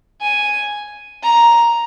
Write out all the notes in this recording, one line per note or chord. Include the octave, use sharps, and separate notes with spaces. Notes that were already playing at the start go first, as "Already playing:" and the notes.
G#5
A#5